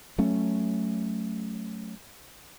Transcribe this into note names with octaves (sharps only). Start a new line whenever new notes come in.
F#3 A3 C#4